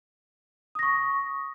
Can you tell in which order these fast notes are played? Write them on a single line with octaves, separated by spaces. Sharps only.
D#6 A#6 C#6